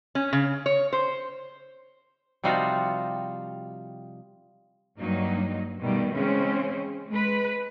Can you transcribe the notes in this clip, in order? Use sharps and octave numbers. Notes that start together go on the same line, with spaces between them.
C#4
C#3
C#5
C5
C3 F3 G3 D#4 F4 F#4
G2 F#3 A#3 D#4
B2 D#3 G3 A3
C#3 E3 G#3 C4 C#4
G#3 B4